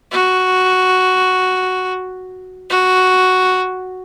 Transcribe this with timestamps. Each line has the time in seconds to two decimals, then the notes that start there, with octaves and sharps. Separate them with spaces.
0.11 F#4
2.69 F#4